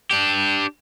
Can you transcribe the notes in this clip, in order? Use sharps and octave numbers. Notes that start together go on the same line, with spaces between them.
D4 G4